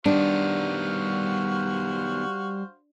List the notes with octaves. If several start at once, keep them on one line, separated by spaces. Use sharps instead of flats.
D#3 G3 B3 D4 F#4 C5 F5